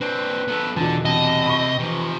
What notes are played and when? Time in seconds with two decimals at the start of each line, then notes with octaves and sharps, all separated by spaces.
0.01 C4 D4 B4
0.48 B3 A4
0.77 E2 B2 D3 A5
1.05 C3 C4 D#5 A5
1.46 B5 C#6
1.79 C3 E3 F3